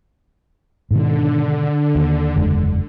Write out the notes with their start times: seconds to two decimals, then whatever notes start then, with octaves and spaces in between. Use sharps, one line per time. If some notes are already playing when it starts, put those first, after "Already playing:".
0.91 G#2 B2 D3 D#3
1.95 D#2
2.36 F#1 E2 G#3